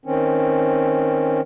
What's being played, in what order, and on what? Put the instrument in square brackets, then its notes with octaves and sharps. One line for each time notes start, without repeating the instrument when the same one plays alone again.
[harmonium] D#3 C4 C#4